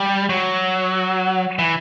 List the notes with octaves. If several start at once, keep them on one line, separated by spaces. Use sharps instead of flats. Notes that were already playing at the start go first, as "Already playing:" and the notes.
Already playing: G3
F#3
E3